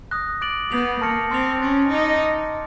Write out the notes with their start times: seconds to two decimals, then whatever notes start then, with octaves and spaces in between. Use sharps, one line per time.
0.11 D#6 F#6 A#6
0.41 D6 F#6 A6 D7 F#7
0.71 B3 D#6 G6 C7 F7
1.01 A#3 A5 C#6 F6 A#6 C#7
1.31 C4 C6 F6 A6 C7 F7
1.61 C#4 F#6 A6 D7
1.91 D#4 A#5 D6 F6 G#6 C#7